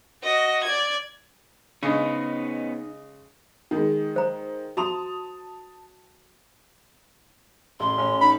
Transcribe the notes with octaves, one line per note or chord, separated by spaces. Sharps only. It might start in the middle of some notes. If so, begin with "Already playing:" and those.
F#4 D#5
D5 G#6
C#3 G#3 B3 C#4 D#4
D#3 G#3 D#4
C5 A#5
F#4 A5 A#5 C6 D#6 F7
A1 C6
A1 C#4
D#4 B5